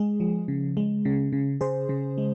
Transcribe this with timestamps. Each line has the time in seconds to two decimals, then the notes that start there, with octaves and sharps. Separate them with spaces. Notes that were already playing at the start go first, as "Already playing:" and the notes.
Already playing: G#3 G#4
0.20 F3
0.48 C#3
0.77 G#3
1.05 C#3
1.33 C#3
1.61 C#3 G#4 C5
1.89 C#3
2.18 G#3